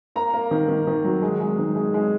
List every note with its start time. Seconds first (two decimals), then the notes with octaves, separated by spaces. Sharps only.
0.16 A#3 A#5
0.34 A#3
0.51 D#3
0.69 D#3
0.87 D#3
1.04 F#3
1.22 G#3
1.40 G#3
1.58 D#3
1.76 G#3
1.94 G#3